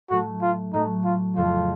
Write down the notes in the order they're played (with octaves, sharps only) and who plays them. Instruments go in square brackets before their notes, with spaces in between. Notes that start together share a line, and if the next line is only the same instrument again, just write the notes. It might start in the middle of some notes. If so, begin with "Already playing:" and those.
[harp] A2 F#3 A3 [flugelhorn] F#4
[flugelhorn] F4
[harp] A2 F#3 A3 [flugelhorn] D#4
[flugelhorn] F4
[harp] F2 C#3 A3 [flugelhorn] F4